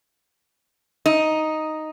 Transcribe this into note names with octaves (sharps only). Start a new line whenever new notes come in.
D#4